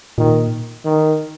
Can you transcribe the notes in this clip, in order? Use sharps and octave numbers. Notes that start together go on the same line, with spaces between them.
A#2 D#3
D#3